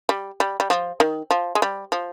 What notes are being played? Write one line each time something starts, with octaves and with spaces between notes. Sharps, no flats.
G3
G3
G3
F3
D#3
F3
G#3
G3
F3